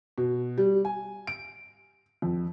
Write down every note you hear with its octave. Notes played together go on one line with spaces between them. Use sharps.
B2
G3
G#5
D7
F2